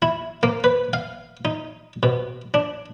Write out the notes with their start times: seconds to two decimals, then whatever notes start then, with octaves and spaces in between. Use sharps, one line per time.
0.02 E4
0.43 A#3
0.64 B4
0.93 F5
1.45 D#4
2.03 B2
2.54 D4